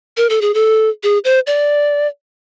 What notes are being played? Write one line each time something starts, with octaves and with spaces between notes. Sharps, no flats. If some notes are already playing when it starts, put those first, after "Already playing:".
A#4
A4
G#4
A4
G#4
C5
D5